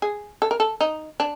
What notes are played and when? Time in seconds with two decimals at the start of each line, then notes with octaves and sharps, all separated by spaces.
0.02 G#4
0.42 A4
0.51 A#4
0.60 A4
0.81 D#4
1.20 D4